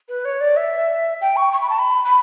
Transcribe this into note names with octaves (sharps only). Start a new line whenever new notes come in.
B4
C#5
D5
E5
G5
C#6
C#6
B5
A5
B5
B5